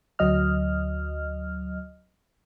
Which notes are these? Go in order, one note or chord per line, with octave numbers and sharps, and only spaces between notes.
D2 F#3 D#5 F6